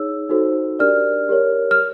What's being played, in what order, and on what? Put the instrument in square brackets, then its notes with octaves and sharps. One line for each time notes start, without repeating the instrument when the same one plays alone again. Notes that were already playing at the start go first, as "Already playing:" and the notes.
Already playing: [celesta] D#4 G#4 C#5 E6
D#4 F#4 A4 C5
D4 G4 A#4 D5 F6
G4 A#4 C#5
F6